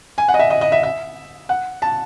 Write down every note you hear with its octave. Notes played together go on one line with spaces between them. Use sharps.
G#5
F#5
D#5
E5
D#5
D#5
E5
E5
F#5
A5